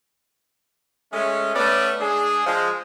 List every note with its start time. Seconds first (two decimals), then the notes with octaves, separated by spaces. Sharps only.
1.13 G#3 A3 C#4
1.56 A3 B3 C#4 B4 D5
2.00 G#3 D4 G#4
2.46 F3 G#3